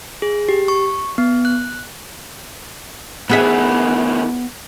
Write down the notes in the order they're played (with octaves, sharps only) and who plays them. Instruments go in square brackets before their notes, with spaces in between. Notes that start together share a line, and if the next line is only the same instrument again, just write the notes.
[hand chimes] G#4
G4
C#6
B3
F#6
[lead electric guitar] D2 E3 [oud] B3 G#4 E5